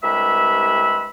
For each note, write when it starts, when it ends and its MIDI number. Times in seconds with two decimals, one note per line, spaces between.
0.03 1.09 36
0.03 1.09 43
0.03 1.09 56
0.03 1.09 76
0.03 1.09 83
0.03 1.09 88